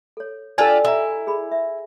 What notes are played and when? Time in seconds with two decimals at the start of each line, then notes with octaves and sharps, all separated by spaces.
0.17 A4 C#5
0.58 D4 F4 G4 A4 D5 G#5 E6
0.85 E4 D#5 E5 A#5
1.27 G#4 B5
1.51 E5